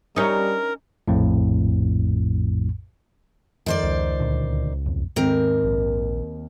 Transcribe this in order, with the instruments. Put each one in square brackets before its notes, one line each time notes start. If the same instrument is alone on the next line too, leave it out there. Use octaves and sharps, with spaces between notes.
[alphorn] G3 [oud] C#4 D#4 [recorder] A#4
[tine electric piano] A#1 F2 A2
[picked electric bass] F2 [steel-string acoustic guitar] D#3 C5 D5
[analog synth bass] C#2
[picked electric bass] D2 A#2 D3
B1 F2
[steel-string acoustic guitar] D#2 C4 A#4 [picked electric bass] G#2 D#3 G#3
[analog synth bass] A#1